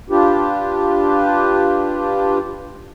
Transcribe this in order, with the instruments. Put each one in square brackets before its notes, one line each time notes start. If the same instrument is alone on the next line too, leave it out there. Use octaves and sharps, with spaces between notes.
[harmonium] D4 F4 G4 B4